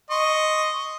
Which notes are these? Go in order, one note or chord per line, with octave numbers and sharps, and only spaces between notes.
D#5 C6 C#6